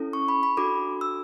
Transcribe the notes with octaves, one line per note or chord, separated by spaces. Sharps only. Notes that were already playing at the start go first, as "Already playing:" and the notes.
Already playing: C#4 E4 A4
C#6
B5
B5
D4 F#4 A4 D6
E6